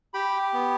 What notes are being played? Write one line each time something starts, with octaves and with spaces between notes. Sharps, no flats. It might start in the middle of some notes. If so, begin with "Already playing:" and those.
G4 G5 B5
B3